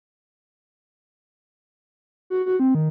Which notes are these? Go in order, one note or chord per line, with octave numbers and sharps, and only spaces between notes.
F#4
F#4
C4
D#3